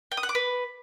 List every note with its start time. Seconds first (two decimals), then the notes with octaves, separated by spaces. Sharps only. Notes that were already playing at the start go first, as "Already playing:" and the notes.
0.12 G5
0.17 D#6
0.23 F#5
0.29 D6
0.35 B4